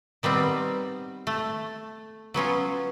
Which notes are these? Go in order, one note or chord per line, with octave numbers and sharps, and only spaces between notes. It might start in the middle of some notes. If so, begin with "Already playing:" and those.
D#3 G3 B3 C4
A3
F#3 B3 C#4 F4